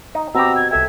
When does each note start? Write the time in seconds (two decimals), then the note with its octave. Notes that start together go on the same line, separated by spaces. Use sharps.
0.15 D#4
0.35 B2 C4 F#4 G4 A#5 E6
0.56 G#6
0.71 C2 A4 E5 G5 G#6